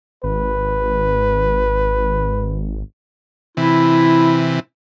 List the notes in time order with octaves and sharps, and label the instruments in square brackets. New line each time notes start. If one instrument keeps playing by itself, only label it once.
[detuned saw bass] G#1 [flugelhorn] B4
[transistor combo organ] C3 E3 [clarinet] E4